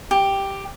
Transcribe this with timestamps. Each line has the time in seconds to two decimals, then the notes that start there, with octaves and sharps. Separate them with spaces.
0.11 G4